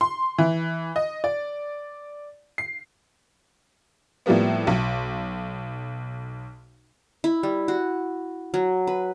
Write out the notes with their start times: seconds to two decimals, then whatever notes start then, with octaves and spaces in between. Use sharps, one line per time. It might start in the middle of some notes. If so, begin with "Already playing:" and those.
0.01 C6
0.38 E3
0.96 D#5
1.24 D5
2.58 C7
4.26 A2 F3 G3 A#3 B3
4.67 B1
7.24 E4
7.43 G3
7.68 F#4
8.54 F#3
8.87 B4